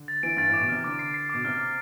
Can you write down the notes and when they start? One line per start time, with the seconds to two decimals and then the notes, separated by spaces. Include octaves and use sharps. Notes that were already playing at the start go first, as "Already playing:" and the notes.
Already playing: D3
0.08 A6
0.23 E3 D7
0.37 G2 A6
0.49 A2 D6
0.60 B2
0.68 C3 F6
0.84 D3 D6
0.99 C7
1.14 C7
1.29 B2 D6
1.45 C3 F6
1.60 D6